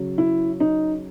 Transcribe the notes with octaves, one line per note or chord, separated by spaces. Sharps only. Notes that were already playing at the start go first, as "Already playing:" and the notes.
Already playing: C#3 F#3
E4
D#4